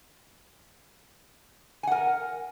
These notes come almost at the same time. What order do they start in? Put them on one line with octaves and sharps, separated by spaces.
G#5 F#5 A#4